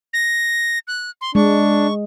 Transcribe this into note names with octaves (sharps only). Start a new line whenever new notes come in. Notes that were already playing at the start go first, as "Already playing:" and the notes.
A#6
F#6
C6
G#3 D4 C#6